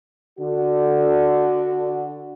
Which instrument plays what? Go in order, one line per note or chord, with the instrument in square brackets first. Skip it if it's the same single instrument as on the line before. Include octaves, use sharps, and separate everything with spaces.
[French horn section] D3 F#4